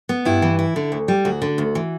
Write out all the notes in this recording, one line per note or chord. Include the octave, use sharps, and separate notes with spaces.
B3
G2 E4
E3
E4
D3
D2
G3
D2 F#4
D3
D2
E3